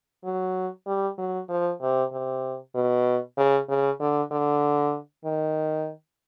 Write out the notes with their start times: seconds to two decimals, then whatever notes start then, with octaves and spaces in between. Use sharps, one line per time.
0.24 F#3
0.87 G3
1.18 F#3
1.49 F3
1.82 C3
2.12 C3
2.75 B2
3.38 C#3
3.69 C#3
4.00 D3
4.31 D3
5.25 D#3